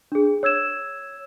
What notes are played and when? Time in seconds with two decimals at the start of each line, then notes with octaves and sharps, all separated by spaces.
0.12 D4 G#4
0.43 C#5 E6 G#6 E7